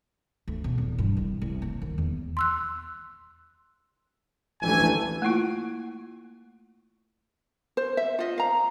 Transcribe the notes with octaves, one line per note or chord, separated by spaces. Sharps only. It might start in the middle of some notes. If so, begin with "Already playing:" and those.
D2
B2
E2
G2
C2
C2
A#3
D#3
E2
C6 E6 F#6
A1 D2 E3 G3 A3 G#5
A3 A#3 E4 F4
C5
E5
F4 D#5
F5 A#5